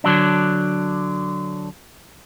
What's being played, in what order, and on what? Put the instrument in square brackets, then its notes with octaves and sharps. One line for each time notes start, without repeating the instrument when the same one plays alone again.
[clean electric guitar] D3 F#3 D4